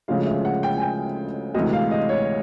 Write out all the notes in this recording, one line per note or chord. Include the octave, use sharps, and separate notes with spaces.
D2 C#3 F3 G#3 F5
E5
F#5
G5
G#5
G5
D2 C3 E3 G#3 D#5
F5
D#5
C#5